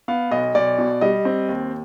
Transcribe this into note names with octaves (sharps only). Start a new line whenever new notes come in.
B3 F5
B1 D#5
B1 D5
B2
G3 D#5
C4
D#2